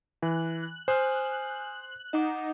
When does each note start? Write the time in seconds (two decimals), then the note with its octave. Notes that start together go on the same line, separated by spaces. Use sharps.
0.22 E3 F#6
0.88 C5 G#5 D#6 F6
2.13 D#4 D#5 F#5 D6